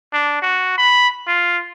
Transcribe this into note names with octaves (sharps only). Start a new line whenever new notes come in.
D4
F#4
B5
F4